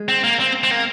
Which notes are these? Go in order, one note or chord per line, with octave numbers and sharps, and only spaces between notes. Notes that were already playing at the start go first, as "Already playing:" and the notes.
Already playing: G#3
C4
A#3
C4
C4
A#3